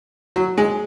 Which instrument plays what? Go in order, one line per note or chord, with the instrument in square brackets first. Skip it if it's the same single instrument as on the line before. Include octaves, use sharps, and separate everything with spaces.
[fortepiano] F#3
G#3